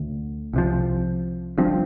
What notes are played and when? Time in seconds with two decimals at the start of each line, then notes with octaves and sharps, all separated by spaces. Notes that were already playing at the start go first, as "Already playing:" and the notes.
Already playing: D2 D3
0.53 C2 C3 F3
1.58 G1 G2 F3 C4